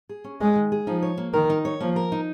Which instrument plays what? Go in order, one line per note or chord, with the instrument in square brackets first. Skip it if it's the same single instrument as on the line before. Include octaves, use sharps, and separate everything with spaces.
[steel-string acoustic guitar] G#4
C#4
[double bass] G#3 [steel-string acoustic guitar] D#5
[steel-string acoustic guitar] D#3
G#4
[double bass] F3 [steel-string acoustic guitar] D#4
[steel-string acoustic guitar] C#5
A#3
[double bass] D#3 [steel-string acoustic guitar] A#4
[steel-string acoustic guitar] D#4
C#5
[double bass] F3 [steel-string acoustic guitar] A#3
[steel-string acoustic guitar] A#4
D#4